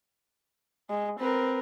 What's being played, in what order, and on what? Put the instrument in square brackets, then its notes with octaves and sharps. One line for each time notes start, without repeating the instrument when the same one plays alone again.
[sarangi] G#3
[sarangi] C4 [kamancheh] A#4 B4